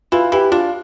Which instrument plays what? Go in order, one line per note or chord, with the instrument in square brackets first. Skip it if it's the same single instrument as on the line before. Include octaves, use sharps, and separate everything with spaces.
[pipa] E3 [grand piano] F4
[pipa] E3 [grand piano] G4
[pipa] D4 [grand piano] F4